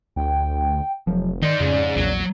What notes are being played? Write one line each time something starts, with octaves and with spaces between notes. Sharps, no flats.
D2 G5
F1 F3 F#3
D#3 D#4 C5 D5
F2 G#2 C#3
A#1 E2 A#2 F#3